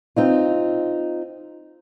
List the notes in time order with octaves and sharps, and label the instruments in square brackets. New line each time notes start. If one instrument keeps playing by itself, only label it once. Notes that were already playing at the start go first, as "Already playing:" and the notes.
[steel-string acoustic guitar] C4 D#4 F4